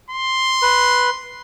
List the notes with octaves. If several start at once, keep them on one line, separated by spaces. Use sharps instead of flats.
C6
B4